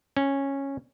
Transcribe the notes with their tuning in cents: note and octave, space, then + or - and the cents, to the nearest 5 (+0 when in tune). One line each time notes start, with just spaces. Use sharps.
C#4 -10